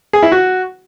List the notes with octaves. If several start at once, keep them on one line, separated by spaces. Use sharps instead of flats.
G#4
E4
F#4